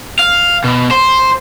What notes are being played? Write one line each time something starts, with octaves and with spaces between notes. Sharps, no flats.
F5
B2
C5